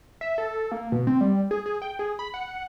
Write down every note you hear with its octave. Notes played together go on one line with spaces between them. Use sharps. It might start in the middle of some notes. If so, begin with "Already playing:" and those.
E5
A4
A#3
B2
C4
G3
G#4
G#4
G5
G#4
B5
F#5